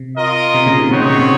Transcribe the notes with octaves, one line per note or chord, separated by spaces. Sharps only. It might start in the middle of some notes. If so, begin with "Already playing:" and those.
Already playing: C3
F4 A#4 D#5
C3
A#2 C#3
C3 D#3
C3 D#3 C4 D#4 F#4 C#5
A#2 C#3
C3
A#2